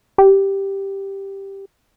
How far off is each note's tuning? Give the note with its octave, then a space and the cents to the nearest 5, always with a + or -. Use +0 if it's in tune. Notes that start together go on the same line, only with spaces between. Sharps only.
G4 +0